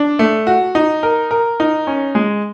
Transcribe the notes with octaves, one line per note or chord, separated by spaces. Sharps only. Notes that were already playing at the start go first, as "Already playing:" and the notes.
Already playing: D4
A3
F#4
D#4
A#4
A#4
D#4
C#4
G#3